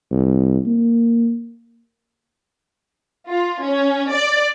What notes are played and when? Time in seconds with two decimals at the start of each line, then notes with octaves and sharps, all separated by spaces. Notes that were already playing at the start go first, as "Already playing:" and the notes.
0.11 C2
0.65 A#3
3.29 F4
3.63 C#4
4.13 D5